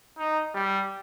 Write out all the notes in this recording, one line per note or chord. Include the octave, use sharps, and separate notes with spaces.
D#4
G3